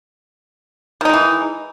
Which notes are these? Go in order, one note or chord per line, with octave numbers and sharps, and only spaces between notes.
D#3 E3 G#3 D#4